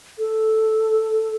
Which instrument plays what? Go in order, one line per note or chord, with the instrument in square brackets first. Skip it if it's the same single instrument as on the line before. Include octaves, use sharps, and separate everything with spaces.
[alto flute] A4